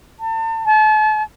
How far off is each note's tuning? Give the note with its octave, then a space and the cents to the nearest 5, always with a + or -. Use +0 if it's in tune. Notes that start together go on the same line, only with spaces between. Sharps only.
A5 +35
A5 -40